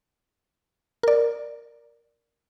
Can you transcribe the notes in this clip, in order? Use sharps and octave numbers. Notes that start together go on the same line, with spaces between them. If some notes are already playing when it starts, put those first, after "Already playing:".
A#4 D5